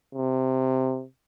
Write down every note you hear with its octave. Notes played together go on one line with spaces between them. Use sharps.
C3